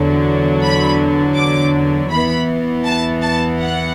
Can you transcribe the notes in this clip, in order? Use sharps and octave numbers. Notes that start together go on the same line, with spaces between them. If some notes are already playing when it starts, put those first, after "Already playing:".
Already playing: E2 D3 F#3
B5
D6
E2 E3 B3 B5
A5
A5
F#5